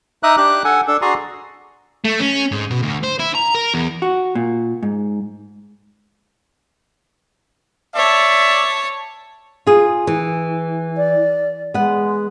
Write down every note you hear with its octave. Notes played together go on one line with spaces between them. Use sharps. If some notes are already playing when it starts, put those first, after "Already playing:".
D#4 E5 A#5 D6 D#6 F#6
D4 G4 D6 F#6
A4 F#5 G#5
D4 A4
F#4 G#4 D5 G#5 A#5 C6
A3
C#4
G#2
B2
D2
C5
E4
A#5
A#4
E2
F#4
A#2
G#2
C#5 D5 E5 A5
F4 G#4
E3
D5
G#3 B3 F#5